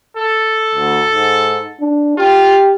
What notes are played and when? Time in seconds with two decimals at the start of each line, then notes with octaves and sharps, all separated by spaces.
0.17 A4
0.75 D2
1.10 G#2
1.81 D4
2.18 F4 G4